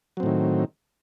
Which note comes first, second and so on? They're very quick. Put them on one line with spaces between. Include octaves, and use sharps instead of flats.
F#3 C4 A2 D#3